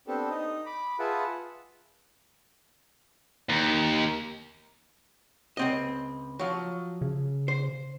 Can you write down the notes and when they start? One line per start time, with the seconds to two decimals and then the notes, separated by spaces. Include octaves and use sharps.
0.07 B3 C4 D4 G4 A4
0.30 D#4 D#5
0.66 B5 D6
0.99 F4 G#4 B4 E5 F#5 A5
3.49 D#2
5.57 C#2 C4 D#5
6.39 F3 F#3
7.01 C#3
7.48 C5